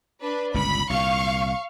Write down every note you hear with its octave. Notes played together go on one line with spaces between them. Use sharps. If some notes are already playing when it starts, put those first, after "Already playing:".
D4 B4
G1 C#2 A#2 B5
C2 A#2 F5 C#6